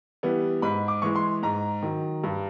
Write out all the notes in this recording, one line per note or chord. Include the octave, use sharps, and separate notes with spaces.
E3 G3 B3
G#2 B5
D6
E3 G#3 C#6
C6
G#2 A#5
D#3 F#3
G2